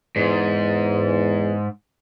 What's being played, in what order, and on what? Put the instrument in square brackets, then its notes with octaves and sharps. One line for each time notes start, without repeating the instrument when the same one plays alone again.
[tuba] E2 [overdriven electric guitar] G#2